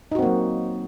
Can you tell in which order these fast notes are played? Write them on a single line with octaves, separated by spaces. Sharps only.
D#4 F#4 C4 A#3 F#3